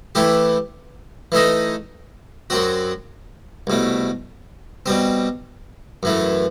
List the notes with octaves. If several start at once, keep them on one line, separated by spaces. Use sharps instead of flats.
E3 A3 E4 G4
E3 A3 D#4 A4 D#5
F#2 F#3 C4 F#4
C2 B2 A3
B2 G3 C4
F#2 E3 A3